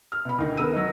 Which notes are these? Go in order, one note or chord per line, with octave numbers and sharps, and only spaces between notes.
F6
B2 B5
D2 D#3
B3 A#4 E6 D#7
F#3 D#4